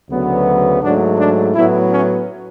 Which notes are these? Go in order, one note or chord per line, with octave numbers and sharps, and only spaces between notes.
D2 C#3 F#3 B3
G#2 F#3 A3 D4
D4
A2 F#3 B3 E4
C#4